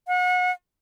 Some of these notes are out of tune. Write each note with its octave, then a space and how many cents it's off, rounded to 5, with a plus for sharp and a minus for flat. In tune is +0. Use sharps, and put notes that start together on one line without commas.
F#5 -35